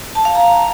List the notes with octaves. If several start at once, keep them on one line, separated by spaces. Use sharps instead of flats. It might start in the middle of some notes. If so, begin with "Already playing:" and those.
A5
F5
A#5